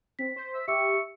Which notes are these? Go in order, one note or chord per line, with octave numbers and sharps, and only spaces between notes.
C4 B6
C5
E5
G4 E5 C#6 E6